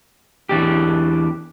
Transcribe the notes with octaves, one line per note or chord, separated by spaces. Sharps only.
E2 E3 D4 G4